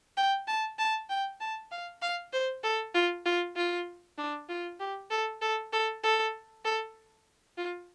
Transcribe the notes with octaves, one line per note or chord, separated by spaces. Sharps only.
G5
A5
A5
G5
A5
F5
F5
C5
A4
F4
F4
F4
D4
F4
G4
A4
A4
A4
A4
A4
F4